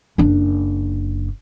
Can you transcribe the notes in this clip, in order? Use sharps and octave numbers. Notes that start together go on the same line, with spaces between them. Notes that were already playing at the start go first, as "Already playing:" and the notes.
F#1 D4